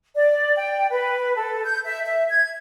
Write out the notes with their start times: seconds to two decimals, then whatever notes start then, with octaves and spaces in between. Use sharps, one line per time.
0.15 D5
0.56 G5
0.91 B4
1.35 A4
1.64 G6
1.85 E5
2.06 E5
2.30 G#6